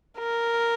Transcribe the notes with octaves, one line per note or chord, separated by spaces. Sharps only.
A#4